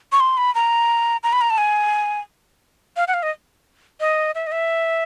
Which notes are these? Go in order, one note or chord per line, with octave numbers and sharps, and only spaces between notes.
C#6
C6
B5
A#5
A#5
B5
A#5
A5
G#5
F5
F#5
F5
D#5
D#5
E5
D#5
E5